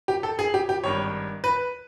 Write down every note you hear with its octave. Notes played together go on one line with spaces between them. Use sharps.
G4
A4
G#4
G4
G4
G#1 G2 D#3 C#5
B4